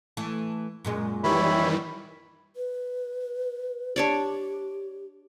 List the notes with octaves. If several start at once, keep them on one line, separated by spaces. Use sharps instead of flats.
E3 A3
F#2 A#2 G#3
D#3 E3 G3 C#5 E5 B5
B4
D4 G4 C#5 D5